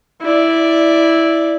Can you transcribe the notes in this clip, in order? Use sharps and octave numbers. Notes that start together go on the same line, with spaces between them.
E4 D5